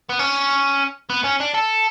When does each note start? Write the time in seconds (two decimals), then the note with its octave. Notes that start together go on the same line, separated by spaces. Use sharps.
0.09 B3
0.19 C#4
1.10 B3
1.24 C#4
1.40 D4
1.54 A4